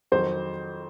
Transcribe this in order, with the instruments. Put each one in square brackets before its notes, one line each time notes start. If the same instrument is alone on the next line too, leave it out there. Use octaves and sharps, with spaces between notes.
[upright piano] F2 D#3 F#3 C5